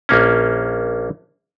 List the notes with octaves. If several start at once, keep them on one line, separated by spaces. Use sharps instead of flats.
A#1 A#3 C#4